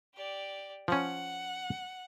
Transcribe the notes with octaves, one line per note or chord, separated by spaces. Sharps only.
G4 D5
F3 C#4 F#5